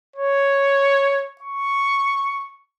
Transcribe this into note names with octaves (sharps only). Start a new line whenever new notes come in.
C#5
C#6